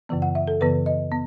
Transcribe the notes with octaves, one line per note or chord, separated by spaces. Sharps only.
F#2 C#3 E3 B3
F#5
E5
A4
F#2 C#3 E3 B3 B4
D#5
B3